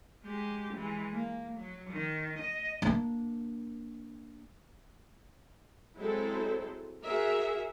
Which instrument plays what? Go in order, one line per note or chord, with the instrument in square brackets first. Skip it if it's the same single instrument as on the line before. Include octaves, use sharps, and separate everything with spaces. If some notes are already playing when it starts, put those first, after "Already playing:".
[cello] G#3 G4
E3 G#3
A#3
F#3
D#3
D#5
[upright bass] A#3 D4
[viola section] F#3 G#3 C4 E4 A4 C5
F#4 G#4 A#4 E5